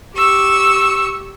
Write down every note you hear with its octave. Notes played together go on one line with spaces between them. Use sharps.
G4 C#6 E6